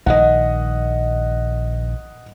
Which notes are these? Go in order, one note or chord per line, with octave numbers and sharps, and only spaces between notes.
A#1 D#3 D#5 F#5